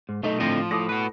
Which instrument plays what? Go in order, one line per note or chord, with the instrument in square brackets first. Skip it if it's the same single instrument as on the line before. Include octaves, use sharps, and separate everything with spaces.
[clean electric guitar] G#2
[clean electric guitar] B1 A3 D#4 [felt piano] D#5
[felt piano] A2 [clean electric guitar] D3 C4 D#5 [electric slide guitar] F3
[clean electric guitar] A2 [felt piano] D6 D#6 A#6
[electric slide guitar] F#4 B4